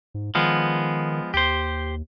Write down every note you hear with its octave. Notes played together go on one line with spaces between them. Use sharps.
G#2
D#3 F3 G#3 B3
D#2 G4 C5